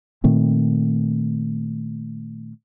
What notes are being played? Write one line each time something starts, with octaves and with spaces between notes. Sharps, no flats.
A#2 D#3 A3 C4